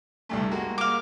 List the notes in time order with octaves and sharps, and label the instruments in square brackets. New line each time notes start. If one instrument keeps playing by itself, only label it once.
[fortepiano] C2 G2 A3
G#3 A#3 F#4
[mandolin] F5 D6